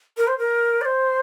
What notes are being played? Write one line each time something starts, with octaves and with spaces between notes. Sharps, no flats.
A#4
C5
A#4
D5
C5